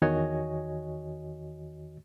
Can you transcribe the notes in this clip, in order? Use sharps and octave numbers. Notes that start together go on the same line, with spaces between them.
E2 D#3 F#4 C#5 D#5 G#5